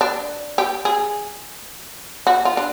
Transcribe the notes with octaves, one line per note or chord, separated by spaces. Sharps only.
D4
G4
G#4
F#4
F4
D4